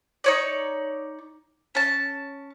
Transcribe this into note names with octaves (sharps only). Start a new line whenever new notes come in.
D#4 C#5 D5
C#4 A5